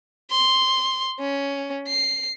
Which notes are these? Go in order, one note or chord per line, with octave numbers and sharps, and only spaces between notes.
C6
C#4
C7